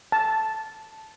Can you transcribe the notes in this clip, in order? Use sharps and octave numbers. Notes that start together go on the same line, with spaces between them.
A5